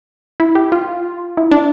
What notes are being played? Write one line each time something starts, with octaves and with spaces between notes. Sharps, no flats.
E4
G4
F4
E4
D4